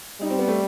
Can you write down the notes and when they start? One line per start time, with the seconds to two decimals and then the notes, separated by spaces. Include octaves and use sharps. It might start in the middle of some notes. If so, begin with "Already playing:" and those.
0.21 G3 D#4
0.30 C4
0.39 B3
0.48 A3